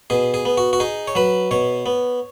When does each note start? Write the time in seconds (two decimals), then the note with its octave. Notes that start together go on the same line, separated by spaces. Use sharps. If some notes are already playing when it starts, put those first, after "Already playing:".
0.10 B2 G#4
0.34 G#4
0.45 B3
0.57 F#4
0.73 F#4
0.80 D#4 G#4
1.08 C#5
1.15 F#3 B4
1.51 B2 C#5
1.86 B3